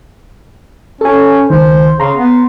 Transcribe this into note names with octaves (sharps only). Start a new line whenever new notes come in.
C#4 A4 G#5
C#2 D#3 C5
C#3 A#5 C6
B3